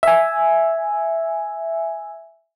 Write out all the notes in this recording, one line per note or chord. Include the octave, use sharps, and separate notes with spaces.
E5 G#5